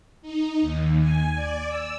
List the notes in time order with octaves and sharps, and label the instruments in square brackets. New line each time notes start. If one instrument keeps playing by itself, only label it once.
[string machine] D#4
D#2
G#5
D5
E6